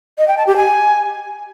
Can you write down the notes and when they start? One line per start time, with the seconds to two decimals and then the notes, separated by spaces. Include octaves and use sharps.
0.18 D#5
0.28 G5
0.37 A5
0.47 G4
0.56 G#5